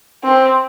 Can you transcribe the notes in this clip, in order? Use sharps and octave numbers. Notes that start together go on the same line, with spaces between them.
C4